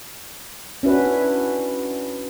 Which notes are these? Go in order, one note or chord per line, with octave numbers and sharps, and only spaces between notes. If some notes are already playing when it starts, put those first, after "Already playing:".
C#4 D4 E4 F#4 B4